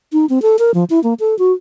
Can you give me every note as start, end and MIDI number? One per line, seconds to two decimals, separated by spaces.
0.13 0.26 63
0.29 0.42 60
0.42 0.57 69
0.59 0.71 70
0.74 0.84 53
0.90 1.02 64
1.04 1.14 58
1.20 1.37 69
1.39 1.52 66